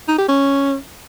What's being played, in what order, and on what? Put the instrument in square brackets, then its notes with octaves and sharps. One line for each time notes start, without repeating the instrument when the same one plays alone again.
[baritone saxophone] D#4
G4
C#4